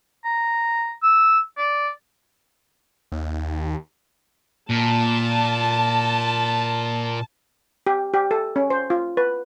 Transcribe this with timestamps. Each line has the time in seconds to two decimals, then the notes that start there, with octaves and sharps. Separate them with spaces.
0.25 A#5
1.03 E6
1.57 D5
3.12 D#2
4.70 A#2 A5
7.87 G4
8.14 G4
8.31 A4
8.56 C#4
8.70 C5
8.90 F4
9.17 B4